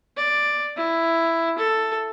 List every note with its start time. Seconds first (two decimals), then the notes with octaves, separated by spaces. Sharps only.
0.17 D5
0.76 E4
1.58 A4